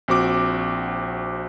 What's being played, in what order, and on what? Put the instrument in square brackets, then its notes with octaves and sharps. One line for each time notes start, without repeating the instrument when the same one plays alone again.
[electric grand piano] A#1 C4 F#4 D6